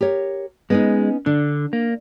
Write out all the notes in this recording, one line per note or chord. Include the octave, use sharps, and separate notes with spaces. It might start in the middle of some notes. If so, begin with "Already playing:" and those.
G4 A#4 C#5
G#3 B3 C#4 D#4
D3 D4
A#3